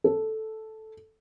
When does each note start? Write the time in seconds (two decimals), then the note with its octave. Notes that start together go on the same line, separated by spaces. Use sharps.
0.04 A4